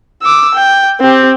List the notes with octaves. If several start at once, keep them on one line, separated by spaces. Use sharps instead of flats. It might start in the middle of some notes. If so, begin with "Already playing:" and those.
D6 E6
G5
C4 G4